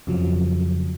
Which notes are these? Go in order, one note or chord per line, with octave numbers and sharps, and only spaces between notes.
F2 C#3 F3 F#3